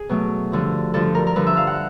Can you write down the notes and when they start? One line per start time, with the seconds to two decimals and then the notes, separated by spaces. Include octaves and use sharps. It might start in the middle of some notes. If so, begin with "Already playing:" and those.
Already playing: G#4
0.09 B2 F#3 A3
0.52 G2 D3 F3
0.94 G2 D3 F3 A4
1.15 A#4
1.27 A#4
1.36 G2 D3 F3 B4
1.46 E5
1.57 F5
1.67 F#5